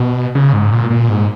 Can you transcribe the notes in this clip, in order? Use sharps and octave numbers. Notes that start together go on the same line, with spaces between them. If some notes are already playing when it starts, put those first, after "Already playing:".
Already playing: B2
C#3
G#2
A#2
A#2
G#2